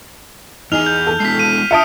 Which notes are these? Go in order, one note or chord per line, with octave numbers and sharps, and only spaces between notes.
E2 D#4 G#4 G#5 F6 F7
G6
A4
G#3 B3 E4 B6 C7
D#7
E5 A5 D#6 F6 C#7 D7